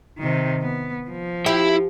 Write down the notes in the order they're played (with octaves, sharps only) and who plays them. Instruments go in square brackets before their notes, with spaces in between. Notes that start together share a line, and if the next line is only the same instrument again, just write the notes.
[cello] C3 D#3
B3
F3
[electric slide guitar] E4 E5 [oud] G4